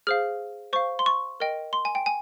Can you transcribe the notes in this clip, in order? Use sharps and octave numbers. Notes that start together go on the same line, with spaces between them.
G#4 C5 F5 F6
C5 F5 C#6
C6
C#6
A#4 D#5 G5
C6
G#5
G5
G#5